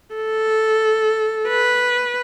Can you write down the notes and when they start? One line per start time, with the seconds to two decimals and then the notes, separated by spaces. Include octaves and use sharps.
0.15 A4
1.48 B4